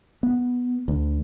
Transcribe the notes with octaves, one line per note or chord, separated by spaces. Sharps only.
B3
D2